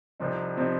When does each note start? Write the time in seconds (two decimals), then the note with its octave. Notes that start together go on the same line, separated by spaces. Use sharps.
0.20 C2 C3 F3 C4 D#4
0.57 C3 F3 C4 D#4